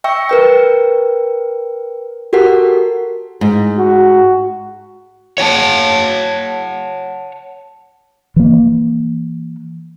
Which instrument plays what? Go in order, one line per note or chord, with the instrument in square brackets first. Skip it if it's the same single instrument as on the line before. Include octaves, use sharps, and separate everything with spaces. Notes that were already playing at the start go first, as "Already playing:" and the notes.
[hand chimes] E5 G5 C#6 E6
A#4 B4 G5
F#4 G4 A4 A#4 F#5 B6
[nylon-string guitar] G#2
[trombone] F#4
[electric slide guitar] C#5 F#5 G#5 A5
[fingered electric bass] E3 A#3